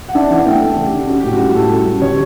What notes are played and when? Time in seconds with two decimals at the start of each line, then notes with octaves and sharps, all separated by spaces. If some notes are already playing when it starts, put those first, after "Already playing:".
0.08 F#5
0.14 D4 E5
0.30 E3 F#5
0.46 A3 G5
0.61 A3 A4
0.78 C#3
0.85 G4
0.93 D4
1.08 C#4 F#4
1.20 A2 G4
1.33 F#4
1.40 G3
1.55 A2 A4
1.71 C#4
1.86 G3
2.02 D3 C#5